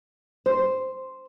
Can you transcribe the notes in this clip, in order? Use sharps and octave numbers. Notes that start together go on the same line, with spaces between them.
C5